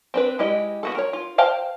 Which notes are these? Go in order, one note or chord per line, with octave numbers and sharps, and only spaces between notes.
C4 D4 B4
G#3 E4 G4 D#5
B3 F#4 A4
A#4 C#5
F4
C5 F5 G5 A5